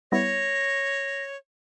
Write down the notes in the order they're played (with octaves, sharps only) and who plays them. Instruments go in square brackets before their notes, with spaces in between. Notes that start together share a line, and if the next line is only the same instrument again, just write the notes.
[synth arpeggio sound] G3 B3 E4 [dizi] C#5 [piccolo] A#6